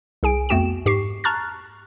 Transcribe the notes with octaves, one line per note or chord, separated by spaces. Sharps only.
C2 G#4 G#5 D7
F2 A3 B3 F#4 G5 E7
G#2 G4 C#6 C7
A5 A#5 C#6 F6 F#6 A6